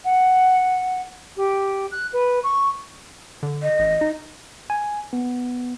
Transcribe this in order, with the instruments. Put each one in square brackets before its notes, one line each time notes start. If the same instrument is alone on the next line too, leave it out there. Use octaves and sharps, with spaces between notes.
[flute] F#5
G4
F#6
B4
C#6
[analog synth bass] D3
[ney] D#5
[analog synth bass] A1
D#4
[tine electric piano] G#5
B3